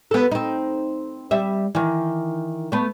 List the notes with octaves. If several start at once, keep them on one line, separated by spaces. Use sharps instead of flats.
B3 A4
C4 D#4
G3 E5
D#3 E3
A3 B3